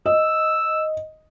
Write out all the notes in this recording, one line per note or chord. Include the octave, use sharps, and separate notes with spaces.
D#5 E6